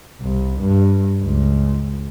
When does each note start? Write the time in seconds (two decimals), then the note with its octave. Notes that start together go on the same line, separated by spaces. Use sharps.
0.21 C2
0.61 G2
1.24 C#2